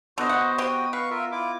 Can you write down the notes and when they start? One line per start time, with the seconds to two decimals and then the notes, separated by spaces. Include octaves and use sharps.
0.18 D3 B3 F#4 C5 D#5
0.29 F#5
0.58 C4 F#4 G4 G5 D#6
0.93 B4 F5 C#6
1.10 F4 A#4 E5
1.32 E4 F4 D6